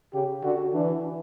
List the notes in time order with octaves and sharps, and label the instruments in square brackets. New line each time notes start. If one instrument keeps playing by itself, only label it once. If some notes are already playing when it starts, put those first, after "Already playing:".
[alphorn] C#3 [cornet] G4
[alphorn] D3 [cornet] F#4
[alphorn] E3 [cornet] D4